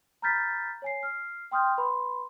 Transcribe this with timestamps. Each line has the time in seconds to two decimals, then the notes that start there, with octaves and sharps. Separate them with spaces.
0.22 A#5 B5 F6 G6 A6 B6
0.82 C#5 G#5 C7
1.03 F6 C7
1.51 G5 C6 D#6 F6 G6
1.78 B4 B5 C6